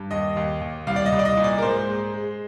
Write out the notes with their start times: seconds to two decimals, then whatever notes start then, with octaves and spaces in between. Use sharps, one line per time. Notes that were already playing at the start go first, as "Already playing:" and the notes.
Already playing: G2
0.11 D#2 D#5
0.37 D#2
0.61 D#2
0.87 C2 F5
0.96 D5
1.06 D#5
1.12 C2
1.19 D5
1.25 D#5
1.37 A#2
1.44 D5
1.58 A#4
1.63 G#2 C5
1.88 G#3
2.14 G#3